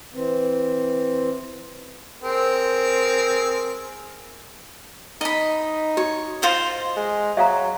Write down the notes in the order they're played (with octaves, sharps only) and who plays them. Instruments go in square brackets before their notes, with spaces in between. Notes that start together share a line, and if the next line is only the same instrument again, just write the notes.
[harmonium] E3 C4
[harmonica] C4 G#4 A#4
[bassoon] D#4 [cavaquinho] D#5 B5
[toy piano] F#4 [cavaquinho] C#5
[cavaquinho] F4 C5 D#5
[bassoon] G#3
[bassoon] F#3 [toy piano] E5 F5 A#5